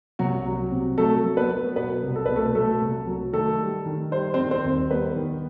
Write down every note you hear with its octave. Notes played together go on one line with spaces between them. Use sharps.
C2 F#3 F#4
F#3
C3
F#3 A3 A4
F#3
B3 B4
F#3
B2 B3 B4
C2
A4
B2 B4
A3 A4
F#3 A3 A4
C2
F#3
D#3 A3 A4
G3
D#3
G3 C5
C4 C5
D#3
C4 C5
D#2
G3 B3 B4
D#3